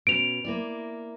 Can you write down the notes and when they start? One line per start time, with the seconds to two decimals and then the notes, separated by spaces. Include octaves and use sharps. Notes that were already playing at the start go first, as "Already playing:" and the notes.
0.07 B2 C#4 D7 F7
0.45 A#3 E4 D5